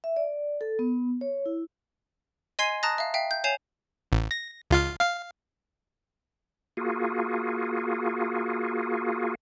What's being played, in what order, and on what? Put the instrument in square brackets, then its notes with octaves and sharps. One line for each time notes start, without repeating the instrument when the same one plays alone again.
[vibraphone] E5
D5
A4
B3
C#5
E4
[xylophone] D#5 G#5 C6 G#6 C7 D#7
A5 A#5 D#6 F#6 A6 A#6
E5 F5
E5 F5 G5
G6
C#5 G#5 G6 C7 E7 F7
[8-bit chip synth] A1
A#6
C#2 F4 F5
F5
[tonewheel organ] A#3 F4 F#4 G#4